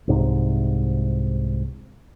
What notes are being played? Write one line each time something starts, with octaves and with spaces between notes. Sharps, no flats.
C2 G#2 C3